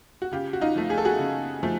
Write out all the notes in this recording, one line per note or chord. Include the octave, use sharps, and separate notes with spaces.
F#4
C#3 F4 G4
F#4
D#4 F4
F3 A3
G#4
A4
F#4 G#4
C#3
F3 A3